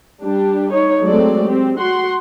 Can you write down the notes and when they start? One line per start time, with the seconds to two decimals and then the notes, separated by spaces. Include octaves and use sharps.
0.22 G3 D4 G4
0.72 D#4 C#5
1.04 F#3 G#3 A3 C4 A4 D5
1.44 C4 G4
1.78 F#4 F#5 C6